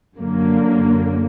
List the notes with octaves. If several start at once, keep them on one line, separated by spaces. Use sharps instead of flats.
F#2 D3 F#3 A#3